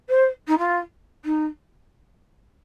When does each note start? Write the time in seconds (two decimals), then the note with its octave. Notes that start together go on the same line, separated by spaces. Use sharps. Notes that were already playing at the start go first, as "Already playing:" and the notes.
0.09 C5
0.47 D#4
0.58 F4
1.25 D#4